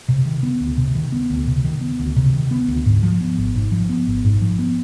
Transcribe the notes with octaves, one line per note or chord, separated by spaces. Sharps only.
C3
D#3
B3
D2
C3
D#3
B3
D2
C3
D#3
B3
D2
C3
D#3
B3
D2
G#2
F3
B3
G#1
G#2
F3
B3
G#1
G#2
F3
B3